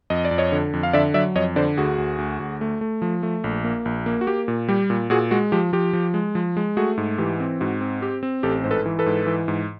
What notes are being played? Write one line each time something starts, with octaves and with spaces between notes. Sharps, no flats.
F2 D#5
D5
F2
C#5 D#5
D3
F2
F5
D3 D5 E5
F#3 D5 E5
F2 C#5 D#5
D3 C5 D5
D2 F#4 G#4
D2
D2
D2
A3
A3
F3
A3
A#1
A#3
A#1
A#3
F#4
A#3 G4
A#2
G3 G4
A#2
A#2 F#4 G#4
G#3 F#4
F3 G4
F3 G4
F3
G#3
F3
G#3
A3 F#4 G#4
G#2
E3 G4
C4
G#2 F#4
C4
C4 G4
C4
A1 G4 A4
G#2 C5
A4 B4
E3
A4 B4
G#2
E3
G#2